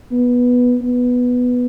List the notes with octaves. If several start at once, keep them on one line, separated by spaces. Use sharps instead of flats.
B3
B3